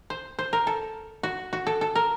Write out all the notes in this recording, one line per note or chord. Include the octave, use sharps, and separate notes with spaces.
C5
C5
A#4
A4
F#4
F#4
A4
A4
A#4